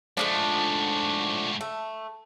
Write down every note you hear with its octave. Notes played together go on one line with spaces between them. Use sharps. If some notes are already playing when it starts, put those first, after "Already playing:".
G#2 D3 F3 A3 D4
A3